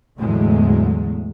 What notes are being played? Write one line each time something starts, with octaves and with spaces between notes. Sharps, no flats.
E2 A2 D3 F#3 G#3 A3